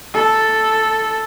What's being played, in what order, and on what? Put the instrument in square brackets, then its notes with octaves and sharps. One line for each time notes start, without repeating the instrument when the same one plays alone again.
[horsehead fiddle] A4